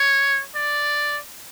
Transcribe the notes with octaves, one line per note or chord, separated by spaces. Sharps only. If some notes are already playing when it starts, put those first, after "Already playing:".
Already playing: C#5
D5